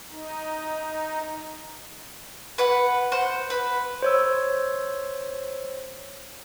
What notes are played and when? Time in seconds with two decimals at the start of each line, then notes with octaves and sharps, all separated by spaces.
0.11 D#4
2.58 B4 F#5
3.12 C5 F#5
3.50 B4
4.02 C5 C#5 E6